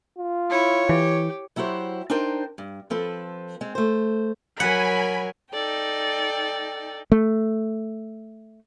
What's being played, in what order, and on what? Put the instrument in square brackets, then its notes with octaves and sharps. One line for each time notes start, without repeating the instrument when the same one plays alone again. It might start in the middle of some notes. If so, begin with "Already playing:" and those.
[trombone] F4
[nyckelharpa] E4 [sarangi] C#5
[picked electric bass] E3 [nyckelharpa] G4
[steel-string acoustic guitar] F#3 E4 F#4 G4 C5
D4 D#4 A#4 C5 G5
G2
F3 C4 A4 B4
G#3 C4
A3 C5
[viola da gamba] F#3 A#4 [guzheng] F#5 [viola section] G#5 B5
[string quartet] D#4 A4 D5 G5
[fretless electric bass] A3